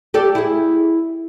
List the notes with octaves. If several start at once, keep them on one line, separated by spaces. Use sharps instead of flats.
G4 A4 D5
E4 G#4